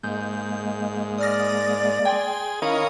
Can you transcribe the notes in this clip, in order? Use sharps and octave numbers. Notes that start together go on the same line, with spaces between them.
G#2 G#3 A#3 G6
D5 D#6 F6 A#6
G#4 G5 C6
D#3 C#4 E4 A#4 C#5 D#5 F5 B5